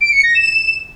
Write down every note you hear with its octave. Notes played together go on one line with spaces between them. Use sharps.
D7
C#7
A#6
E7